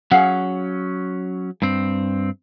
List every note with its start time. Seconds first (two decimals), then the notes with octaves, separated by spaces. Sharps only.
0.12 F#3 C#4 G#4 F5 F#5
1.62 G2 C4